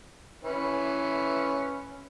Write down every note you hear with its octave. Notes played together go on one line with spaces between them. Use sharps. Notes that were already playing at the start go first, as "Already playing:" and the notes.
E3 C#4 B4